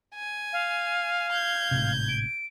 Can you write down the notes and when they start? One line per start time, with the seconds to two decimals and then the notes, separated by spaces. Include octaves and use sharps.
0.15 G#5
0.53 F5
1.32 G6 G#6
1.71 G#1 A2 C3
2.09 D7